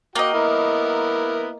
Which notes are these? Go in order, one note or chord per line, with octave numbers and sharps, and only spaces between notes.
A#3 F#4 D#5 G5
B3 E4 A#4